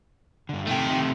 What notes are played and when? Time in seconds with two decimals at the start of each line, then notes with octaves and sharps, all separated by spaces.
0.49 G2 D3
0.67 C3 D#3 A3 G5